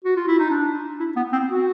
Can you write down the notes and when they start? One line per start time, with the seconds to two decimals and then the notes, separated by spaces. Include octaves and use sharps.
0.05 F#4
0.16 F4
0.27 E4
0.39 D#4
0.50 D4
1.00 E4
1.16 B3
1.33 C4
1.50 F#4